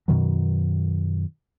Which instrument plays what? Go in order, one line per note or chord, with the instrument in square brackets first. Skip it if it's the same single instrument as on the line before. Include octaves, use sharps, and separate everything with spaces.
[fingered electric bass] F#2 B2 D#3 F#3